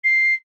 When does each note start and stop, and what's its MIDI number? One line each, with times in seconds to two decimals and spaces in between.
0.04 0.34 96